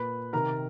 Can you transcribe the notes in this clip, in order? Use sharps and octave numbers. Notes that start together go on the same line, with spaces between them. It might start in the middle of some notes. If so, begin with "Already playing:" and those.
Already playing: A#2 B4 B5
C3 D#3 A#4 A#5